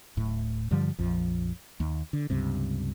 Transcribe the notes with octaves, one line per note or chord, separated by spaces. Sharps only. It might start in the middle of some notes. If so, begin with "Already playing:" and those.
D1 A2
G2 D3 F3 G3
A#1 F2 F3
D#2
D3
C#2 G2 C3